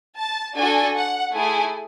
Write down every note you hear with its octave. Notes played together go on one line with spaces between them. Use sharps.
A5
D4 F#4 A4 G#5
F#5
A3 E4 G#4 G#5